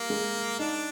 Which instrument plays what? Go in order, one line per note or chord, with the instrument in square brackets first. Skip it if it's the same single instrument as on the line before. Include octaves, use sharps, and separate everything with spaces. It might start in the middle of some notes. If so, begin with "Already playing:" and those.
Already playing: [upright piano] G3 [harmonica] A#3
[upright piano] G#3
[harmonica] D4 [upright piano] D#4